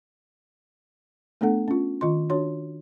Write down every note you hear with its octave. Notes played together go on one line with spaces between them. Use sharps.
A3 B3 D4 A4 F#5
C#4 F4
D#3 F4 D#5 C6
D4 F#4 C#5 C6